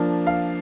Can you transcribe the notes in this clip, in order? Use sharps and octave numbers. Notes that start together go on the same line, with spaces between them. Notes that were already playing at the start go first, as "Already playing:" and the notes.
Already playing: F3 A#3 D4
F5